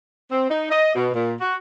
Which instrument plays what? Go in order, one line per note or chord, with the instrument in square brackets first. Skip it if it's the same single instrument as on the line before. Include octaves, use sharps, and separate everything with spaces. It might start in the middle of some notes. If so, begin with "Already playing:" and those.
[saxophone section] C4
D#4
D#5
B2
A#2
F#4